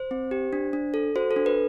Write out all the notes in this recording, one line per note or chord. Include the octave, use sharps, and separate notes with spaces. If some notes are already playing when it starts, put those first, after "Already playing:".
Already playing: C5
C4
G4
D4
D4
A4
F#4 C5
A4
D4
B4